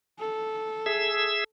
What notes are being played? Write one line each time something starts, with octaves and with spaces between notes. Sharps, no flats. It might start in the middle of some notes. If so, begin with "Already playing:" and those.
A4
G#4 E5 E6